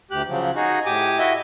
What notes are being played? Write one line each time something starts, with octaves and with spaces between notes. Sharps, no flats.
D2 G4 F#6
C#3 F3 F#3
D#4 F#4 G#4
A2 G4 G#5 D6 D#6
E4 F#4 D#5 E5